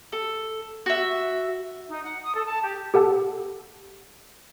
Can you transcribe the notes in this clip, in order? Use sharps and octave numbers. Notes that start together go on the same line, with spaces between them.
A4
F#4 E5
D#4
F#5
D#6
A4
A5
G4
G4 A4 F#5 A5 E6